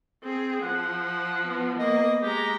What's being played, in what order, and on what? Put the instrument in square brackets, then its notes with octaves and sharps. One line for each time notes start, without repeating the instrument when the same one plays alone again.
[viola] C4 G#4
[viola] F3 [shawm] F#5
[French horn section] B3
[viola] A#3 [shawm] D#5
[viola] G#3 A#5 [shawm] G4